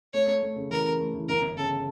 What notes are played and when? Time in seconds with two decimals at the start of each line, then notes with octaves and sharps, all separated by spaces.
0.14 A3 C#5
0.27 A3
0.43 A3
0.56 C#3
0.71 E3 A#4
0.85 C#3
1.00 A3
1.14 E3
1.28 G1 A#4
1.42 G1
1.56 C#3 A4